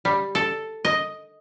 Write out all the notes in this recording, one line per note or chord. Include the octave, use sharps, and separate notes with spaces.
G3
A4
D#5